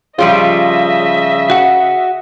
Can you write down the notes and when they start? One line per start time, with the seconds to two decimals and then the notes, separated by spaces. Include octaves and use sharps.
0.19 C#3 F3 G3 F4 D#5 E5
1.50 F#4 F#5